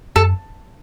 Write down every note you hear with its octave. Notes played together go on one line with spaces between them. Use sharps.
F#2 A4